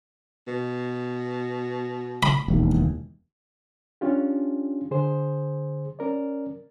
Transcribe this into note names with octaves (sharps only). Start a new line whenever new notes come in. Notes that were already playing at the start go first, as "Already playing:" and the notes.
B2
B5
E1 D#2
C#4 D4 F4 G4
D3 G#4 C5
C#4 A#4 D5